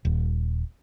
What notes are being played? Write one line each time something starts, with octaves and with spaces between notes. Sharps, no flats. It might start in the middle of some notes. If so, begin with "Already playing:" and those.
D#1